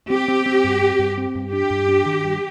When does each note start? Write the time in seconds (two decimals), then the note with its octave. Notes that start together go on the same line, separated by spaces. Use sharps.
0.10 C4 G4
0.28 C4
0.46 C4
0.64 G2
0.82 C4
0.99 G2
1.18 C4
1.35 G2
1.53 D4 G4
1.70 G2
1.88 D4
2.06 D#3
2.24 G2